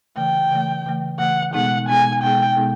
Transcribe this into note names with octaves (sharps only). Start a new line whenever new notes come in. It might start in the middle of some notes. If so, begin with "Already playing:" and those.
C#3 E3 A3 G5
C#3 E3 A3
C#3 E3 A3
C#3 E3 A3 F#5
B2 G#3 B3 D#4 G#4 F#5
B2 G#3 B3 D#4 G#4 G#5
B2 G#3 B3 D#4 G#4 G5
B2 G#3 B3 D#4 G#4